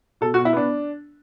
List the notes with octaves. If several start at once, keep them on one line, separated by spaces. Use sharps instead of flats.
B2 A4
F#4
B2
E4
B3 D4